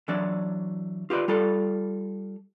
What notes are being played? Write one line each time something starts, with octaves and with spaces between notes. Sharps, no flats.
E3 F#3 D4 C#5 D5
F4 G4 B4 D5
G3 F4 A4 D5